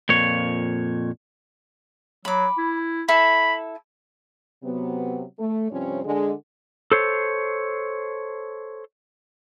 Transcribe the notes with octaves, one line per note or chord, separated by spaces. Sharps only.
F2 A#2 C#5
F#3 B5 D6
E4
E4 A4 B5
C3 F#3 B3
A3
G2 C3 F3 C4 C#4 C#5
D3 G#3
A4 C5 C#5